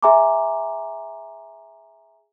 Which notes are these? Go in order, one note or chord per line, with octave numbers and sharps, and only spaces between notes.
G#4 E5 G#5 A#5 C6 D6